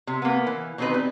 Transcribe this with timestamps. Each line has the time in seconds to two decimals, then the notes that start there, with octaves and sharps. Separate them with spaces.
0.07 C3
0.22 A#3 B3
0.47 E3
0.78 B2 D#3 C4 D#4 B4
0.94 G3